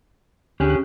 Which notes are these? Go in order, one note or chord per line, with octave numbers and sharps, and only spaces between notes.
D2 D3 C#4 G4 G#4 F#6